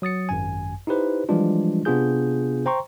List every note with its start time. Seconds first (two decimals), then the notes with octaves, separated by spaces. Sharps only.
0.02 F#3 D#6 A6 C#7
0.29 G#1 F#2 G#5
0.87 D#4 E4 G4 B4 C5
1.29 E3 F3 G3 G#3 D4 F4
1.85 C3 B3 D4 F4 G#4 G6
2.66 C5 G5 A#5 C6 C#6